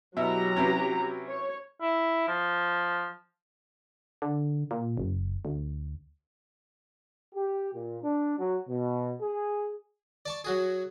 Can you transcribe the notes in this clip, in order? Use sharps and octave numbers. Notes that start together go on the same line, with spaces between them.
B2 F#3 E4 G4 A#5
C3 E3 C#4
C#5
E4
F3
D3
A#2
F#1
D2
G4
A#2
D4
F#3
B2
G#4
D5 A5 C#6
F#3 F#4 G#4